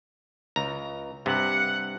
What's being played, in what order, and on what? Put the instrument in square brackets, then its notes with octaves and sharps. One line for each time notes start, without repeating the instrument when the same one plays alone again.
[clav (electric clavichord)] C#2 A#5
[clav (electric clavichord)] G2 C3 [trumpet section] F#5